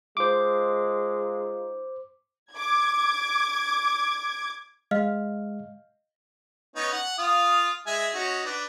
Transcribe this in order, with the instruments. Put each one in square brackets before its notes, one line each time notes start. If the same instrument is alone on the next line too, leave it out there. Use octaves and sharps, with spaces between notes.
[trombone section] G#3 D#4 F4 [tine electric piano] C5 D6
[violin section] D6 G#6
[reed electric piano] G#3 [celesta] D#5 F5 F6
[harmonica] B3 C#4 D#4
F#5
F4 F5 D#6
G#3 E5 G#5
C#4 D#4 F#4
D4 B4